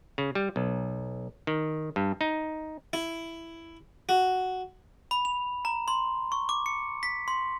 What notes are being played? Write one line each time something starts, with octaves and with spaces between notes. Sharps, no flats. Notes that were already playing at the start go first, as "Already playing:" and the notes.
C#3
G3
B1
D#3
G2
D#4
E4
F#4
B5
F7
A#5
C6
C#6
D6
C#7
B6
C6